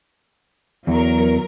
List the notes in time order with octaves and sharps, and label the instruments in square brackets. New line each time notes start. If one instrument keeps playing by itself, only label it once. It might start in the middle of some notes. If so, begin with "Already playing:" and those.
[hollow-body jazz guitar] E2 [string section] F#3 A#4